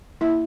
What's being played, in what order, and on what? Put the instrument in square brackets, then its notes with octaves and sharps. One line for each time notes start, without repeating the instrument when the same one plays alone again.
[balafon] A#3 E4 E5